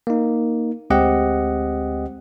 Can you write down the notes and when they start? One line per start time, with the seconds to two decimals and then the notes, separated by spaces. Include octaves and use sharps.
0.07 A#3 D#4
0.90 D2 G#3 C4 G4 D#5 F#5